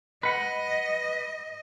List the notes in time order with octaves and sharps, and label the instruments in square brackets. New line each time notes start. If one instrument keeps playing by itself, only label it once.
[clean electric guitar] B4 F#5 [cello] D#5